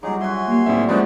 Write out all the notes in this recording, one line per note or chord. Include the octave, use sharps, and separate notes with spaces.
F#3 G3 D#4 F4 G#4 D6
F#4 E5 G#5 C6
A#3 G4
A2 D3 C4 E5
F3 G#3 C#4 D#4 F#4 B4 C5 D5